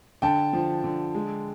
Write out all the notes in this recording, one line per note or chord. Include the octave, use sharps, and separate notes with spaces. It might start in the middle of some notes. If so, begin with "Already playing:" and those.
D3 G5 A5
F3
D3
G#3